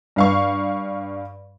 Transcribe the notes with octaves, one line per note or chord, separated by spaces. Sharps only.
G2 F5 C#6